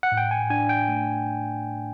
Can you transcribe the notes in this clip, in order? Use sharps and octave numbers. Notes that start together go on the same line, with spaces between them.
F#5
A2
G5
G#5
D4 G#5
G5
A3